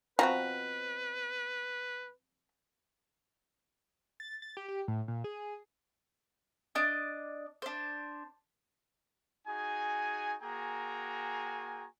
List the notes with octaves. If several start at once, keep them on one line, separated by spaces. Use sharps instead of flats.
B2 F3 C4 F#4 B4 A#5
A6
A6
G4
G4
A2
A#2
G#4
D4 D5 D#5
D4 C5
D#4 F#4 G#4 G#5
A#3 F#4 G#4 G5 G#5 A#5